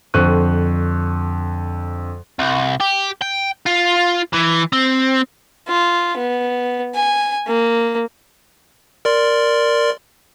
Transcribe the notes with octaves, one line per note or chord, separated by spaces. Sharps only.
F2 D3 C5 C#6 F#6 D#7
C2
G4
G5
F4
E3
C4
F4
B3
G#5
A#3
A#4 D5 C6